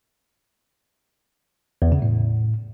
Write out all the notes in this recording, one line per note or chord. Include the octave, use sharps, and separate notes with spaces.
E2
C#3
A2